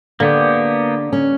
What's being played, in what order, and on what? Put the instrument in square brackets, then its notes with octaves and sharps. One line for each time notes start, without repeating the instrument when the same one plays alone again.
[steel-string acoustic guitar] D3 [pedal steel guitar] A#3 B3 G4
[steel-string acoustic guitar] C#4